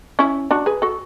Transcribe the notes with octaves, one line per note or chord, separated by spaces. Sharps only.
C#4 E4
D4 F#4
G#4 B4
F#4 A4